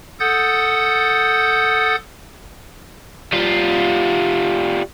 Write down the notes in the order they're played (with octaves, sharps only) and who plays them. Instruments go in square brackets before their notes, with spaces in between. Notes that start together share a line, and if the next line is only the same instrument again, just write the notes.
[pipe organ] A4 F#5 D#6 G6 A6
[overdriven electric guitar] G3 F4